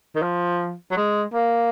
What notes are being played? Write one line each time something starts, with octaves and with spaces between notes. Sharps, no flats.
D#3
F3
F#3
G#3
A#3